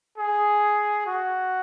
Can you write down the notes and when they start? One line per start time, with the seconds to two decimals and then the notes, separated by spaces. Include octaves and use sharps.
0.18 G#4
1.07 F#4